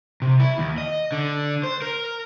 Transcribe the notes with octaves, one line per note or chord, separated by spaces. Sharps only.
C3
E4
D#2
D#5
D3
C5
A#4